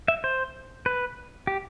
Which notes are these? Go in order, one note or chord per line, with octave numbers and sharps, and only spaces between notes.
E5
C5
B4
G4